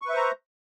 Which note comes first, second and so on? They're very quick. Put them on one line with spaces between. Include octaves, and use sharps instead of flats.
C#6 B4 E5 C5 A#5